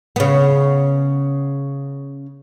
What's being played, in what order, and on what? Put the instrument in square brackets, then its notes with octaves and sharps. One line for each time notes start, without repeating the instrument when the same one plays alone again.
[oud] C#3 B3